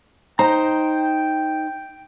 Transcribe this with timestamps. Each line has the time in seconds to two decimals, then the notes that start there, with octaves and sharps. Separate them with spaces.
0.39 D#4 C5 G5 A#5